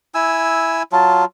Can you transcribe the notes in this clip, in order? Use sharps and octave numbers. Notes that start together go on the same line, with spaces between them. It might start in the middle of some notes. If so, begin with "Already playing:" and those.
E4 G#5 E6
F#3 F4 A5